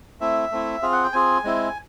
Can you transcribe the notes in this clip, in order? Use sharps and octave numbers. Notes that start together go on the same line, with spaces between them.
A3 C4 E4 E5
A3 C4 E4
C4 F4 G#4 F5
F#5
G5
C4 F4 G#4 G#5
G#3 C4 E4